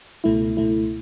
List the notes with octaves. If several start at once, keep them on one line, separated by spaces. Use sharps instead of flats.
C#2 B2 A3 E4
C#2 B2 A3 E4